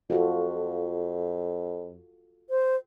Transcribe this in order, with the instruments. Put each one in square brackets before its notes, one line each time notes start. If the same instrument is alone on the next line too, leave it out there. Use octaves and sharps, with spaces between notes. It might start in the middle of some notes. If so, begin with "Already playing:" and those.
[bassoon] F2 [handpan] F4 F#4 A4
[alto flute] C5